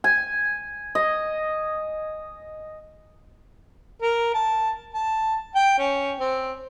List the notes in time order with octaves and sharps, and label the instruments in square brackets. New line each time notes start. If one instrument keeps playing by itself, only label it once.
[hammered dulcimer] G#5
D#5
[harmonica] A#4
A5
A5
G5
C#4
C4